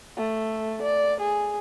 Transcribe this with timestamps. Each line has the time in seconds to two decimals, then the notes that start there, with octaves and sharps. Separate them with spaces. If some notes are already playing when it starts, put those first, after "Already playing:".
0.17 A3
0.82 D5
1.21 G#4